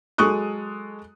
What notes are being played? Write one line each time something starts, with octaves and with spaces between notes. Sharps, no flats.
F#3 G#3 A4 C#6 D#6 F#6